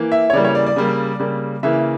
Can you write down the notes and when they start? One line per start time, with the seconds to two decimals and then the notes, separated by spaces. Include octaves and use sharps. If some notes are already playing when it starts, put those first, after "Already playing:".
Already playing: E3 A#3
0.12 E5
0.30 C#5
0.33 C#3 E3 G3 A#3 D5
0.44 C#5
0.55 D5
0.66 D5
0.76 C#3 G3 A#3
1.20 C#3 G3 A#3
1.63 C#3 E3 A#3 E5